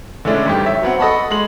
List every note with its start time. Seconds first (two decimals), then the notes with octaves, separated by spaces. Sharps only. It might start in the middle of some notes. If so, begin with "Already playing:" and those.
0.25 D3 G#3 A3 C#4 D4 E4
0.46 G#1 G2 G4
0.66 C#5 E5
0.82 F#3 B3 C4 F#5
0.99 A4 D#5 F#5 A5 B5 C#6
1.31 G#3 C6 F#7